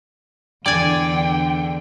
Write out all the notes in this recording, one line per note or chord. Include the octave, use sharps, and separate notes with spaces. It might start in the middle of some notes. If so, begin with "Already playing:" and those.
E2 D3 D5 G5 G#5